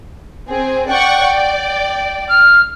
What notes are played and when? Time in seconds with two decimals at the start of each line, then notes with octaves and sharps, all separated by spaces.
0.48 C4 G#4
0.89 D5 F#5 G5 C#6
1.22 D5
2.29 F6